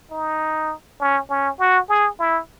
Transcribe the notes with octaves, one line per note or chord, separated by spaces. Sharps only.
D#4
C#4
C#4
F#4
G#4
E4